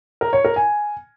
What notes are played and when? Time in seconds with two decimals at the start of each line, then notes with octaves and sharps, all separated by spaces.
0.21 A#4
0.33 C#5
0.45 A#4
0.56 G#5